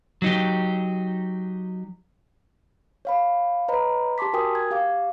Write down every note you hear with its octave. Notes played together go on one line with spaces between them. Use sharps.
F#3 D#4 G4
C#5 F5 B5
B4 C#5 D#5 A#5 B5
G4 A5 C6 D6 B6
F#4 A#4 G5 G#5 D#6
G#6
G4 F5 D6